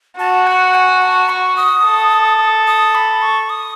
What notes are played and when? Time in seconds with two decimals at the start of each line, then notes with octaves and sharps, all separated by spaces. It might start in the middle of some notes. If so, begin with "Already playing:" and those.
0.19 F#4 A5
0.47 F#5
0.75 G#5
1.02 A5
1.29 C#6
1.57 D#6
1.85 A4
2.67 D#6
2.95 B5
3.22 C#6
3.50 D#6